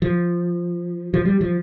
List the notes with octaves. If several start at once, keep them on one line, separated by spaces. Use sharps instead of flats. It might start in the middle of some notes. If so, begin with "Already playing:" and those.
F3
F3
G3
F3